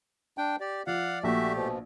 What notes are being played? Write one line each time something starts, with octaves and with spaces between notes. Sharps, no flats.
D4 G5
G4 D5
F3 D5 F5 F#5
A#1 A3 F#4 G4 E5
B2 F3